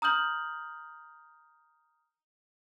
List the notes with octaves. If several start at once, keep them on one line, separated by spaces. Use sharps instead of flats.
A#5 D#6 F6 G6 F#7